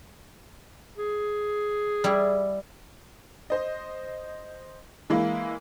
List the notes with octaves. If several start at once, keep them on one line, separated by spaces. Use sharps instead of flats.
G#4
G3 E4
C5 D#5
E3 G#3 A#3 E4